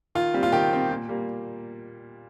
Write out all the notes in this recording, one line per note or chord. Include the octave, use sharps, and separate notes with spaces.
D#3 F4
G3 C4
F4
D#3 G4
G3 C4
A#2
G3 A#3